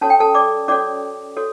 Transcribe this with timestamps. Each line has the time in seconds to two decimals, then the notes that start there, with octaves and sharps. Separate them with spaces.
0.01 C#4 F#4 A4 C#5 A5
0.10 G5
0.20 A4 A5
0.35 D5 D6
0.68 C#4 F#4 A4 C#5 D5 D6
1.37 F#4 A4 C#5